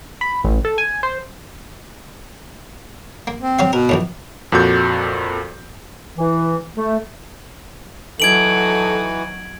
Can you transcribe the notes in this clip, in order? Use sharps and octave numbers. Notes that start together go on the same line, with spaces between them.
B5
A1
A4
G#5
C5
A#3
C4
F#3 F#4 F5
B2 A#4
A#1 E2 A2
F2 A#2 F#4 A4 G6
E3
A3
E3 F#3 D#4 F#4 A4 G#6 D7 F#7